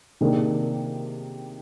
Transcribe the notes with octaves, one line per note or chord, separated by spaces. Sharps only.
C3 D#3 A#3 D4 G#4